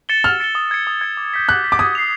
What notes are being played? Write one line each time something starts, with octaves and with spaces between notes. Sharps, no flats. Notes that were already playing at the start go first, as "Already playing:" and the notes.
A6 C#7 E7 G7
E6 F6
A6 C#7 E7 G7
D#6
G#6 C#7
D#6
G#6 C#7
D6
G6 B6
D6 F#6
G6 B6
D6
D#6 G#6
C7 F7